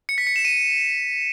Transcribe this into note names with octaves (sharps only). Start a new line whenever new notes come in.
C#7
B6
C#7
E7
D#7